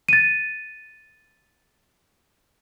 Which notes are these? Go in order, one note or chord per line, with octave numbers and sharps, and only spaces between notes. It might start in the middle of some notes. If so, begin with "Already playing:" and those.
A6 D#7